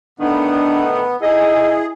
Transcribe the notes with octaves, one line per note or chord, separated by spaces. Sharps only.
A2 D3 D#3 B3 D4
D#4 E4 G#4 A4 D#5